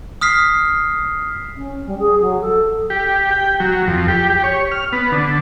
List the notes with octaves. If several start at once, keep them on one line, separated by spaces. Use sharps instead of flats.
D#6 F6 B6 C7
C#4
G3
G#4
F#3
A4
G4
G5
F#3
F2
G4
G4
C#5
F6
B3
D3